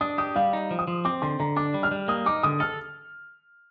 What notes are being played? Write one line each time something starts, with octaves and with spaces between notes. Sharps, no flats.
D4 D#6
G4 D#6
G3 F5
D#4
F3
D#6
F3
C4 D6
D3 C6
D3 A#5
D4 D6
G3
F6
G3
A#3 D#6
D#4 D6
D3 D#6
A4 F6